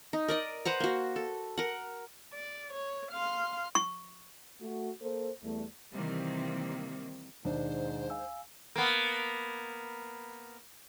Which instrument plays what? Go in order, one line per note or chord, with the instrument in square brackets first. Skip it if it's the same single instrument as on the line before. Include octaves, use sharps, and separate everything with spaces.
[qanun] D#4
A#4 D5 D#5
B4 C5 F#5 A#5
A#3 F#4
A4
A#4 F#5
[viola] D5
C#5
F5 C6
[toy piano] C#6
[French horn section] A3 F#4
A#3 A4 C5
E2 G3 A3
[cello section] C3 D#3 E3 G3 A#3 C4
[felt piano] D#2 D4 [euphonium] G#2 [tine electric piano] B2 [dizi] C5
[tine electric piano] F5 G#5 E6
[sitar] A#3 B3